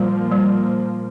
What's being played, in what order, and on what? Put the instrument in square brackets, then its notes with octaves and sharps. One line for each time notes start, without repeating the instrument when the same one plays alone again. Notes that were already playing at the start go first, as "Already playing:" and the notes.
Already playing: [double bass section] A#2 F3 A#3 [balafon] G3
[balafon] G3